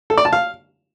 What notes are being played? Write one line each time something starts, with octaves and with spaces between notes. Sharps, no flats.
A4
D5
A5
F5